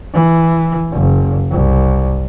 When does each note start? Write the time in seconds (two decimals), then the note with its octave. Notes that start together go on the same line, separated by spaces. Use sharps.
0.14 E3
0.93 F#1
1.51 C2